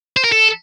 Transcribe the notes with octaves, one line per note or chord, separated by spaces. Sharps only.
C5
A#4
A4